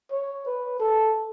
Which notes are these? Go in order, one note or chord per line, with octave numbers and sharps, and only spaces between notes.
C#5
B4
A4